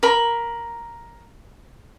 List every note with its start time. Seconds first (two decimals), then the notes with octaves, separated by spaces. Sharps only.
0.03 A#4 B5